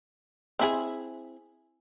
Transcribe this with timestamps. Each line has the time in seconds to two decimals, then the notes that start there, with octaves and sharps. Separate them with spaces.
0.59 C4 E4 G#4